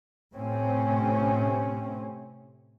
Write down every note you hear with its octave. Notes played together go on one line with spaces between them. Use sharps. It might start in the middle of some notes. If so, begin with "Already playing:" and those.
A2 C3 C4 C#4